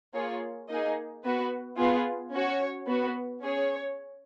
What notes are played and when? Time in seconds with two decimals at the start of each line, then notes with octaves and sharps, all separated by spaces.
0.14 A#3 F4 G#4 C#5
0.69 A#3 D#4 G#4 D#5
1.23 B3 F#4 B4
1.77 B3 F4 G#4
2.32 C#4 F#4 C#5
2.87 B3 F#4
3.40 C#4 G#4 C#5